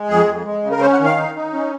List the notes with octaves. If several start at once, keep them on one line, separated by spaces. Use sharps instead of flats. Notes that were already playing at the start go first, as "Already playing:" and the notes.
Already playing: G#3
F2 G#4
F2
G#3
C#3
A#4
C#4 C5
F#5
D#3
F5
D#4
D#4
C#4